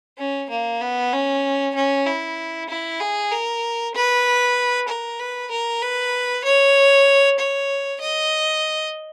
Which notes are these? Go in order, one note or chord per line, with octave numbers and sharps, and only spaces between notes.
C#4
A#3
B3
C#4
C#4
E4
E4
G#4
A#4
B4
A#4
B4
A#4
B4
C#5
C#5
D#5